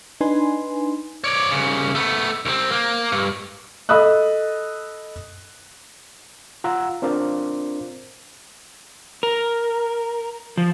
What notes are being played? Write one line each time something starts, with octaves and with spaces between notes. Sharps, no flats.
D4 D#4 B4 G#5 C6
C#5 D5
C2 C#3
A3 B3
C2 C4
A#3
G2
A4 D#5 B5 D#6 E6 F#6
F4 F#5 A#5 E6
C4 D4 F4 A#4 C5 D5
A#4
F3